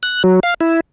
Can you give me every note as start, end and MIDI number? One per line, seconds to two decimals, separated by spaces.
0.03 0.23 90
0.24 0.40 54
0.43 0.54 77
0.61 0.80 64